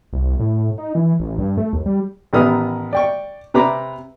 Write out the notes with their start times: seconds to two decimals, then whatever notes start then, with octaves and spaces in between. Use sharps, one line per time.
0.13 C2
0.40 A2
0.78 D#4
0.95 E3
1.20 A1
1.38 G2
1.57 A3
1.73 D#2
1.86 G3
2.33 A1 D#3 B3 D#6 F6
2.93 D5 G5 C#6
3.54 C3 B4 A#5 B5 D6